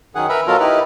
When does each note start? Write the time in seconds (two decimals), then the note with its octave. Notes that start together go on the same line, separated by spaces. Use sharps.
0.15 F#2 D#3 G#4 F#5
0.29 A#4 B4 E5 B5
0.47 B2 F#3 F4 A4 A#4
0.60 D#4 E4 G4 B4